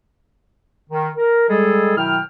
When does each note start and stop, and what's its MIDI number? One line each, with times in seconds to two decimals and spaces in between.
0.90 1.09 51
1.17 1.46 70
1.49 1.93 55
1.49 1.93 56
1.49 1.93 68
1.49 1.93 69
1.96 2.19 47
1.96 2.19 51
1.96 2.19 54
1.96 2.19 64
1.96 2.19 79
1.96 2.19 89